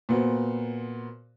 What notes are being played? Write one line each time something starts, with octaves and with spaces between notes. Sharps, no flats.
A#2 B3 F#4 C5